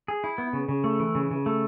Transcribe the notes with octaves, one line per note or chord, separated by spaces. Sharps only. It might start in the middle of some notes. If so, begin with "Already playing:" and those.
G#4
E4
B3
C#3
C#3
A3
E3
C#3
C#3
A3